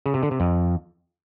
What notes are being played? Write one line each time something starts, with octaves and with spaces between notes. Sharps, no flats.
C#3
C3
D3
C3
F2